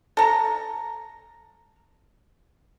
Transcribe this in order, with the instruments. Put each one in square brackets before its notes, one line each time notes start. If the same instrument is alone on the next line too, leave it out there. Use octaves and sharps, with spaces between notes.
[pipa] A4 A#5